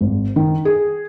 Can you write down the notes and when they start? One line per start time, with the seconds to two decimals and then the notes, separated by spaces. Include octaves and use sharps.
0.01 G#1
0.36 D#3
0.65 G#4